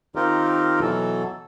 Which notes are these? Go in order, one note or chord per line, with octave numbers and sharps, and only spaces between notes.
D#3 C4 D#4 F4 G4 A#4
B2 E3 F#3 A4